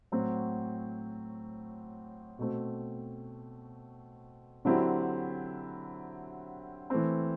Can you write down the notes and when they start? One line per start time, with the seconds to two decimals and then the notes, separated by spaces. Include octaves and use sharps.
0.12 A2 F#3 C4 F#4
2.38 B2 A3 C4
4.65 D3 F#3 C4 E4 G4
6.90 E3 A3 C4